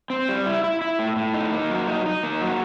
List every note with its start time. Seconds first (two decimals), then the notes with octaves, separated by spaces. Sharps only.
0.10 C4
0.29 G3
0.46 E4
0.64 E4
0.81 E4
0.99 A2
1.17 A2
1.34 D#4
1.53 A#3
1.70 F#3
1.88 D#4
2.06 D#4
2.23 A#3
2.41 F#3